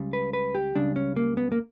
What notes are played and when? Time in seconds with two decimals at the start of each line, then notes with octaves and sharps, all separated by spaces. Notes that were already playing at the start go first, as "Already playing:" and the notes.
Already playing: C#2 C#3 G3
0.13 B4
0.33 B4
0.55 G4
0.75 C#2 C#3 G3 D4
0.96 C#4
1.16 A#3
1.37 B3
1.52 A#3